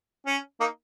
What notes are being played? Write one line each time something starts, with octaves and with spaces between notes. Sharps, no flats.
C#4
A#3 D#4